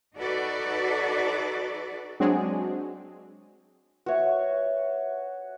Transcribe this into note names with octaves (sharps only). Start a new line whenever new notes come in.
D#4 F#4 A4 B4 D5
F#3 G#3 C4 D4 F#4 G#4
F#4 B4 C#5 E5